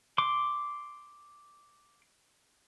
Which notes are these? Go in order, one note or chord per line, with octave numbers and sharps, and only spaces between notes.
C6 D6